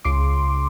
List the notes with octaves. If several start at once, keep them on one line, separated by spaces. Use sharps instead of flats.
C#2 C6 D6